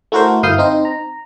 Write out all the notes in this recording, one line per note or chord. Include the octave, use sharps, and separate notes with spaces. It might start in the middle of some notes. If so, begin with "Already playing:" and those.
A3 E4 F#4 A#4 C5
G1 E4 F5 D#6 G6 C7
C4 D#4 C5
A#5